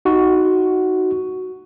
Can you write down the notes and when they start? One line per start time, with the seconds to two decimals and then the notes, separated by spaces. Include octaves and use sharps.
0.05 D#4 F#4